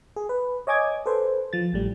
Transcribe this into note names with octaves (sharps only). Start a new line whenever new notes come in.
G#4
B4
C#5 D#5 G#5 D6 G#6
A4 B4 C5
F3 A6
A1 A2 G3